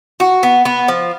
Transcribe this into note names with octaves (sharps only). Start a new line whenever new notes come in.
F#4
B3
B3
F3